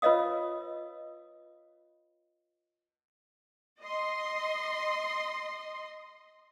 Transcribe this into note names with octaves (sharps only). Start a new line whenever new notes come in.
F4 B4 C#5 D#5 F5 D#6
D#5 C6